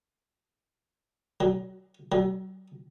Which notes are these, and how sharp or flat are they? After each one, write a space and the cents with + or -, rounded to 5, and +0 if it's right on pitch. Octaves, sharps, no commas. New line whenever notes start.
F#3 +30
F#3 +40